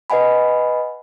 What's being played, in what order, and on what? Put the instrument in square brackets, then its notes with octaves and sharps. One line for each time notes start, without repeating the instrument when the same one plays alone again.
[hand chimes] B4 D#5 F#5 G#5 B5